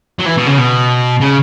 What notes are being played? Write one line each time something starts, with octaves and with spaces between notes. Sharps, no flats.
F#3
E3
B2
C#3
B2
C#3